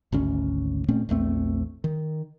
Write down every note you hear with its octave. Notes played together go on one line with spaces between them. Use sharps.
G#1 D2 C#4
A#2 A3 C4 C#4
A#1 E2 A3 C4
D#3